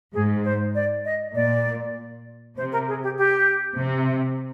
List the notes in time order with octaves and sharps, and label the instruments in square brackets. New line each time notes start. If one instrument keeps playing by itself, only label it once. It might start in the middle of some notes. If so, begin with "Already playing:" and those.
[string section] G#2 [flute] G#4
[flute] C5
D5
D#5
[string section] A#2 [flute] D5
[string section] C3 [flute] C5
[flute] A#4
G#4
G4
G4
[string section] C3